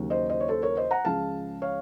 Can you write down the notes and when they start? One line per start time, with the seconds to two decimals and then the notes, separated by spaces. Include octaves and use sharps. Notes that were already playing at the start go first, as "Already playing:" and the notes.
Already playing: D#2 C#3 F#3
0.10 C5 D#5
0.29 C5 D#5
0.40 C#5
0.48 A4 C5
0.62 A#4 C#5
0.77 C5 D#5
0.91 F#5 A#5
1.05 C#2 C#3 F3 F5 A5
1.62 C#5 F5